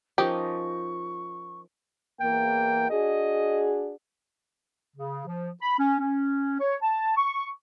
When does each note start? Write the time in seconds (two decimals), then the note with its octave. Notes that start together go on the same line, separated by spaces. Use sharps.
0.18 F3 C#4 D#4 G4 A#4 C5 C#6 D#6
2.20 E2 A#3 G5
2.90 D4 F#4 G#4 D#5
4.97 C#3
5.26 F3
5.62 B5
5.79 C#4
6.00 C#4
6.60 C#5
6.82 A5
7.17 C#6